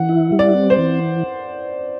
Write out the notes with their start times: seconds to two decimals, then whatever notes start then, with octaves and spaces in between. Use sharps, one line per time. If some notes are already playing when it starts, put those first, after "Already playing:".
Already playing: E3 F#5
0.09 E4
0.32 G3
0.39 D5
0.54 C4
0.70 C5
0.78 E3